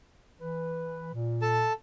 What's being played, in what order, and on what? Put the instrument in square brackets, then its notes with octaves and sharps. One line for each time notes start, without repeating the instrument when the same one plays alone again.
[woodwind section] E3 B4
A#2
[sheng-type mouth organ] A4 A5